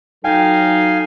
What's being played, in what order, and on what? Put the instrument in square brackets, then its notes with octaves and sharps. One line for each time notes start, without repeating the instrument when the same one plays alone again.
[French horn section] F#3 A4 [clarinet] D#4 [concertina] F5 G#5 [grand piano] G5